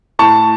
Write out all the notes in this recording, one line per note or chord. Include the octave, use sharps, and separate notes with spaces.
A2 A5 C#6